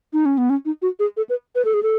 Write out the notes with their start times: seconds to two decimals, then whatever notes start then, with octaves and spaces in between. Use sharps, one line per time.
0.13 D#4
0.25 C#4
0.38 B3
0.50 C#4
0.65 D#4
0.82 F#4
0.99 G#4
1.17 A4
1.30 B4
1.55 B4
1.65 A4
1.74 G#4
1.83 A4